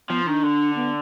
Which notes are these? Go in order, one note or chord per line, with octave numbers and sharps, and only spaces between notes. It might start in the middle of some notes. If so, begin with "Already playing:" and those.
F3 B3
D#3 D4
D3
B3